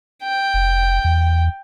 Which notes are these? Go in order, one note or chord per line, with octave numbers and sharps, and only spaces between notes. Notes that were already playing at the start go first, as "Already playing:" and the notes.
G5
F1
E2